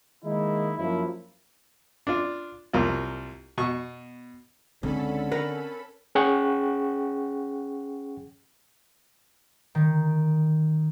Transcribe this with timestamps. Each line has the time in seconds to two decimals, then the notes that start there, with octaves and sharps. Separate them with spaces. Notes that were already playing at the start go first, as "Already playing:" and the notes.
0.24 D#3 G#3 A#3 D#4 E4
0.78 F#2 F3 A#3 E4
2.07 D4 F4
2.73 C2 F#3 A#3 F4
3.58 B2 C#6
4.83 C#2 D3 C4 C#4 A4 B5
5.32 A#4 B4 F#5
6.15 C#4 G#4 F#5 G5 C#6
9.75 D#3